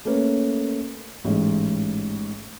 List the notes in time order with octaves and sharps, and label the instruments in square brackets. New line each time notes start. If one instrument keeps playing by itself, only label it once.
[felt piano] A3 A#3 C#4 B4
A1 G#2